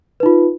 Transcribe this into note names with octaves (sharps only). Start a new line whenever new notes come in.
D#4 F4 B4